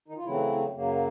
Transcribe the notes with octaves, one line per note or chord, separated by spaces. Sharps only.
D#3 D#4
F4
C#3 E3 F#3 A3 C4 E4
F#2 C#3 F#3 A#3